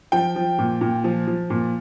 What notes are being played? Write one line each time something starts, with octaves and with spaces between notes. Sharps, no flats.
F3 G5
F3
A#2
A#2
F3
F3
A#2